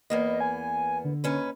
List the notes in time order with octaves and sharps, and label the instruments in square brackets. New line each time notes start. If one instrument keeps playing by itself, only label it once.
[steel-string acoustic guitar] E2 A#3 B3 [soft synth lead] D#5
[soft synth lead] G#5
D3
[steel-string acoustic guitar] D#2 C#4 B4